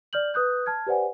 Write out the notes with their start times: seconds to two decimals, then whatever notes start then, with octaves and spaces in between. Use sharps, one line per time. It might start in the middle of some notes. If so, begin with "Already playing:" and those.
0.13 D5 F6 G6 F#7
0.34 B4 D#6 F#6 G6
0.66 A5 F6 G#6
0.87 G4 B4 C5 D5 F#5 G#5